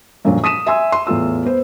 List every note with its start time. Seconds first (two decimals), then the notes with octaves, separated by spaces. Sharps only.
0.25 F#2 A#2 D3 F3 F#3
0.44 D#6 B6 D#7 E7
0.67 E5 G#5 C6 E6
0.92 C6
1.07 E2 A2 F4 E6
1.45 B3 C5